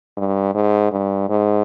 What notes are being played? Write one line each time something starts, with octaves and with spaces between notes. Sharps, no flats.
G2
G#2
G2
G#2